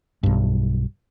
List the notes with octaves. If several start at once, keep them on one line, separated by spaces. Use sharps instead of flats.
B1 G2